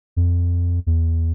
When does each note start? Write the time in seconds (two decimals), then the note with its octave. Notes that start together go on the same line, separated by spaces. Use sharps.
0.17 F2
0.87 E2